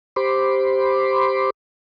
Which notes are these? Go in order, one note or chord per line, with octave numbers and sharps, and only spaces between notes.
G4 C5 B5 C6 D6